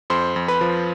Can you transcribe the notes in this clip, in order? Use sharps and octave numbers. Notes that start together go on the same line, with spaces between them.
F2 C5 C6
F2
B4 B5
F3